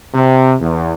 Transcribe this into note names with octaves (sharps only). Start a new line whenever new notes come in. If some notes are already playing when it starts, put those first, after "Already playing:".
C3
E2